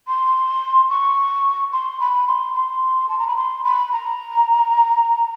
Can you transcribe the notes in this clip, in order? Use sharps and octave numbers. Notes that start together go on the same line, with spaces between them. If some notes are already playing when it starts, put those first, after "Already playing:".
C6
C#6
C6
B5
C6
C6
A5
A#5
B5
C6
B5
A#5